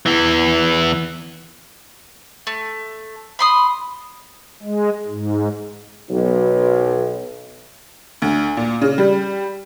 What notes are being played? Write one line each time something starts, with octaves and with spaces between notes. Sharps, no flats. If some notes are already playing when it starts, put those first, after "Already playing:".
E2 E3
A3
B5 C6 D#6
G#3
G#2
B1
D2
A#2
C#3
G3